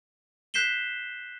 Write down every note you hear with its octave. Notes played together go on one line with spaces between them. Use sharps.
F#6 G6 B6 C7 E7 G7